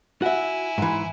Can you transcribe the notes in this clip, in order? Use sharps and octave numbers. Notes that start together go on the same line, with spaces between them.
E4 F#4 E5 G#5
G#2 E3